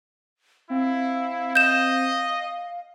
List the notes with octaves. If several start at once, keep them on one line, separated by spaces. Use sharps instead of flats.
C4 E4 F5
D#5 G6 E7